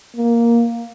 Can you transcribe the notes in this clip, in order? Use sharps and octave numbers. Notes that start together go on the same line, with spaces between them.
A#3